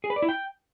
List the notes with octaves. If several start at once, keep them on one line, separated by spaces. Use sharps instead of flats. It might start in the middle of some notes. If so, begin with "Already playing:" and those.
G#4
B4
D5
E4
G5